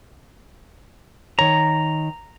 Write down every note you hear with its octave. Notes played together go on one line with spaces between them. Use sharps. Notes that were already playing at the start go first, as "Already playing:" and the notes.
D#3 C#5 A#5